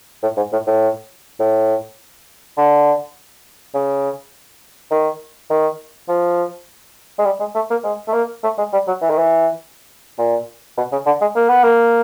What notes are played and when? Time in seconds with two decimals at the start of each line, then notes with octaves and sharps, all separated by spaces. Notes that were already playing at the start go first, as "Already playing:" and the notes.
0.22 A2
0.37 G#2
0.52 A2
0.66 A2
1.40 A2
2.57 D3
3.74 C#3
4.91 D#3
5.50 D#3
6.08 F3
7.18 G#3
7.25 G3
7.40 G#3
7.55 A3
7.70 A#3
7.84 G#3
8.07 A3
8.13 A#3
8.43 A3
8.58 G#3
8.73 G3
8.87 F#3
9.01 E3
9.09 D#3
9.18 E3
10.18 A#2
10.77 B2
10.92 C#3
11.06 D3
11.21 G#3
11.36 A#3
11.49 B3
11.63 A#3